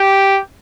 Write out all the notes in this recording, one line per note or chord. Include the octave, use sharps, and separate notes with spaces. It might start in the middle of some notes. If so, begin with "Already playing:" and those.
Already playing: G4